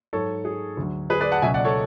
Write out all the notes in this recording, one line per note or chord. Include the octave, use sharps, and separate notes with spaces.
G#2 F#3 A4 C#5
G#4
D2 D3 F#3
G#4 B4
B4 D5
F#5 A5
C#2 B2 F#3 E5 G#5
D5 F#5
A4 C#5